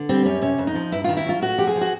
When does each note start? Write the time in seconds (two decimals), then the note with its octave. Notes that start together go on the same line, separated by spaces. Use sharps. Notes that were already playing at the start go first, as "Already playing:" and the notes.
Already playing: D3
0.09 G3 C4
0.25 F#2 C#4
0.42 C3 C#4
0.58 F2
0.67 D#4
0.75 F3
0.92 G2 E4
1.04 D#3 F4
1.17 E4
1.26 F#3 F4
1.42 A2 F#4
1.58 F3 G4
1.67 G#4
1.76 F3
1.81 F#4